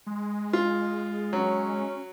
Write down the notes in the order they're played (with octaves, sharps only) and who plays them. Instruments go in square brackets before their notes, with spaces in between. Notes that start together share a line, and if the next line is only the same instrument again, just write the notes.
[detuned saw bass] G#3
[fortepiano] F4
[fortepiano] F#3 [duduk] C#4